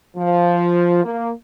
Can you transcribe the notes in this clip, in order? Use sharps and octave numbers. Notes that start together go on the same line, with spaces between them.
F3
A#3